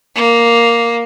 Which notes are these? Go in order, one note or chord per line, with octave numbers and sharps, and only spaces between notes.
A#3